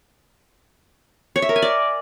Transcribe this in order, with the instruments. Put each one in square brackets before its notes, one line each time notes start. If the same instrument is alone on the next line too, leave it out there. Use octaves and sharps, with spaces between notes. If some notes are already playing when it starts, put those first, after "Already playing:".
[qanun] C#5
E5
A#4
G#5
D5